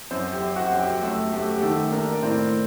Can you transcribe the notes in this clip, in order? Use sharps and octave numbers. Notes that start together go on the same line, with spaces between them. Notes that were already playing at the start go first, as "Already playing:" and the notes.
F#2 C4 C5
G4 G5
F#2
F#4 F#5
F#2
G4 G5
F#2 A3 A4
A3 G4
G4
D#3 A3 A4
A#3 D4 A#4
D5
A2 C4 C5